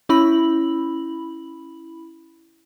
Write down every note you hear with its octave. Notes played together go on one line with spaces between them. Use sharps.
C#4 E4 B5 F#7